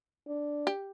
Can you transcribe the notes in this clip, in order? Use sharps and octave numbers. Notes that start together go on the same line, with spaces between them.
D4
G4